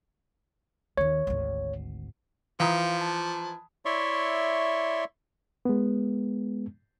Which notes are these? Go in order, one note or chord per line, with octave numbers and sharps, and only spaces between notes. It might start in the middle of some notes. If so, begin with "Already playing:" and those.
D#2 D#3 C#5
G#1 D2
E3 F3 F5 G5 A#5 D#6
A5
E4 C#5 D5 E5 C6 C#6
G#3 B3